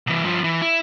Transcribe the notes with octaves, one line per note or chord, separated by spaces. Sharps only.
C2 E3
G2 F3
E3
E4